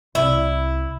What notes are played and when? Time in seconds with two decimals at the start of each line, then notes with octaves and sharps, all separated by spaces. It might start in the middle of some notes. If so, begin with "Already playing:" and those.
0.15 C2 E4